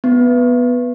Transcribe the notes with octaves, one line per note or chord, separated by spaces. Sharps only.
B3